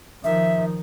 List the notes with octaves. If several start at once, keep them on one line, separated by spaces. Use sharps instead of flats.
D#3 F3 E5